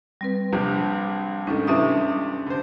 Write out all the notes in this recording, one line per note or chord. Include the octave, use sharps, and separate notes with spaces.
G3 C4 B4
A#1 C3 F3
G#2 D#3 C#4 D4 A4
G2 C3 E3 C#4 E5 D#6
D3 C5